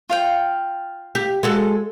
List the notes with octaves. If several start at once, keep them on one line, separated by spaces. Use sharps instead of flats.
F4 F5 G5
G4
G#3 F#4 A4